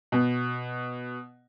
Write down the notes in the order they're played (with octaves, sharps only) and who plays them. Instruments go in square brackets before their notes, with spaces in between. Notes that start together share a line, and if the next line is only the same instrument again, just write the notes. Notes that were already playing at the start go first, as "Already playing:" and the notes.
[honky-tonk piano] B2